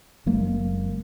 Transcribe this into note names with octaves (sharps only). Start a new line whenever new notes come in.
F#1 F#3 G#3 A#3